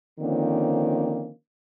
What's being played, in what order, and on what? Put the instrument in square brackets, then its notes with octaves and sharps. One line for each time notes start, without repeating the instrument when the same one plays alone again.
[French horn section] D3 D#3 F3 A#3 C4 C#4